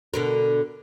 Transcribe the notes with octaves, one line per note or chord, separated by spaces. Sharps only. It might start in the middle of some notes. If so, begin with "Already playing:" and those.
B2 D3 A#4